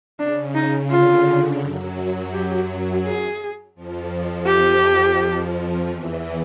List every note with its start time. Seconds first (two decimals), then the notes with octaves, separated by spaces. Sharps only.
0.19 C#3 D4
0.55 D#4
0.90 D3 F4
1.26 D3
1.61 F#2 F#3
2.33 G4
3.04 G#4
3.75 F2 F3
4.47 G4
5.89 E2 E3